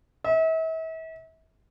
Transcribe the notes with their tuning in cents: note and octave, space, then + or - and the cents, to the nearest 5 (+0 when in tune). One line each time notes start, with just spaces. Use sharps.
E5 -40